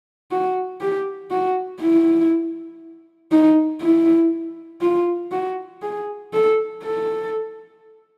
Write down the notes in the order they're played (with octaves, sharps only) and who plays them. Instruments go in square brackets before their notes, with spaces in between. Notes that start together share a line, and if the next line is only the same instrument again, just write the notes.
[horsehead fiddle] F#4
G4
F#4
E4
D#4
E4
F4
F#4
G#4
A4
A4